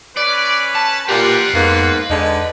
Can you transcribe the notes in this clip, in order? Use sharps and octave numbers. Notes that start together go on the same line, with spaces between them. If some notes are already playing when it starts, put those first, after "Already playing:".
C#4 B4 D5
A5
A#2 F4 G4 B4 F#5 A#5 C6
F2 G#2 A#3 B3
E2 D3 G#3 D#4